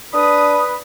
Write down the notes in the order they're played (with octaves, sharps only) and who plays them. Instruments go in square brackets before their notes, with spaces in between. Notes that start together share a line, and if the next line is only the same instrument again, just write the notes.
[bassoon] D4 [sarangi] B4 [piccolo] D#6